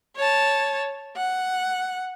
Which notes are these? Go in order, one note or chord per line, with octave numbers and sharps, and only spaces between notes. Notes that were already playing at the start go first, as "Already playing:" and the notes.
C#5 A5
F#5